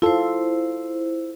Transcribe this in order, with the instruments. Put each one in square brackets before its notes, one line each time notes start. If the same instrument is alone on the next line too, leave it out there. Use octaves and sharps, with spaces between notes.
[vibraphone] E4 C5 [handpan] F4 A4